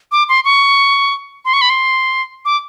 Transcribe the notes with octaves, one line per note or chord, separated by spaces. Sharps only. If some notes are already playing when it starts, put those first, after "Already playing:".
D6
C6
C#6
C6
C#6
B5
C6
D6